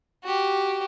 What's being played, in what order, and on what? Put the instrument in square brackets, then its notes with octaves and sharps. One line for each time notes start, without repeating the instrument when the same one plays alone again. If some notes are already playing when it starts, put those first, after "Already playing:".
[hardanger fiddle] F#4 G4